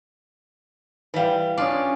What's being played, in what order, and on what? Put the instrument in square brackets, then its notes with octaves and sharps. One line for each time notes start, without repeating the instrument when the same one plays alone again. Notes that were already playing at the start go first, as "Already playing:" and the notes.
[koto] E3 G3 [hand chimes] B4 F5
[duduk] C#4 [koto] D4 F4 D5 [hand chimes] D6 D#6